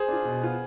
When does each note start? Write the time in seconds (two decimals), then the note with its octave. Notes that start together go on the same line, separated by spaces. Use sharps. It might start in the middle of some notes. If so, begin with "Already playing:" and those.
Already playing: G#4 C5
0.08 D4 F4
0.25 B2
0.42 B3 F4